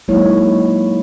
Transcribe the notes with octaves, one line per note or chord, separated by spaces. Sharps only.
F#3 G#3 A#3 D#4 E4 C#5